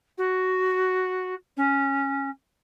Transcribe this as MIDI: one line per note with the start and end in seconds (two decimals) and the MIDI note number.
0.17 1.34 66
1.56 2.29 61